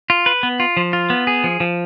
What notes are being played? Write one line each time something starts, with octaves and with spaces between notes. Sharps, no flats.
F4
B4
B3
F4
F3
F4
B3
G#4
F3
F3